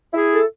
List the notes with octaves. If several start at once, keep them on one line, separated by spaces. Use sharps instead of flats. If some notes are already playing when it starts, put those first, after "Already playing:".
E4 G#4
A4